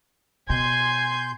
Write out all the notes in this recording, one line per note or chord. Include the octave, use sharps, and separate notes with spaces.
B2 G#5 C6 G6